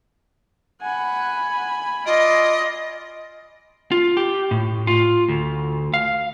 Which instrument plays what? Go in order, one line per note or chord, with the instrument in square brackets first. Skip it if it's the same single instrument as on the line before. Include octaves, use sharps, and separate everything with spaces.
[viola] F#5 [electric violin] G#5 B5
[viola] F4 D5 [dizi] D#5
[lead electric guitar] F4
G4
A2
F4
D2
F5